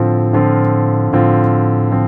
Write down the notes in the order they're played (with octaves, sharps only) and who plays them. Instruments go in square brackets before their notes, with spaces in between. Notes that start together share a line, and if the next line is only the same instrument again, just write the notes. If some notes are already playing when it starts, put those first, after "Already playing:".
Already playing: [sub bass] A2 [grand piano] D3 F3 C4 F4
[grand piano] D3 F3 C4 F4
[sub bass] A2 [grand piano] D3 F3 C4 F4
[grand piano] D3 F3 C4